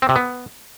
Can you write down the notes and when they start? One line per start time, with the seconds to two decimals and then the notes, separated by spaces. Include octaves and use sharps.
0.02 C4
0.09 C3
0.16 B3